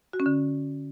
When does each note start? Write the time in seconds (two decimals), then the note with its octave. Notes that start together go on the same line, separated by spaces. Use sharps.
0.13 F#4
0.20 C#4
0.26 D3